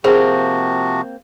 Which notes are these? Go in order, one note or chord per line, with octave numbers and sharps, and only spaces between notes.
C3 F3 A#3 C4 F#4 G#4